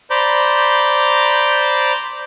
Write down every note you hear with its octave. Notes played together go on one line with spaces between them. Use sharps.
C5 D5 A#5 B5 D6 G6